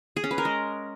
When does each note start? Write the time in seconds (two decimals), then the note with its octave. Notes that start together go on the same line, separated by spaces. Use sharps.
0.16 G#4
0.24 C#4
0.31 B4
0.38 A#4
0.45 G#3